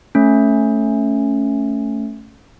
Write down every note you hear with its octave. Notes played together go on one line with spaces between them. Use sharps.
A3 C#4